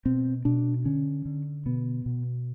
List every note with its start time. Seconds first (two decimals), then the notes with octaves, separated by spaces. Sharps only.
0.06 B2 C4
0.45 B2 D4
0.85 D3 C#4
1.25 D3
1.66 B2 B3
2.06 B2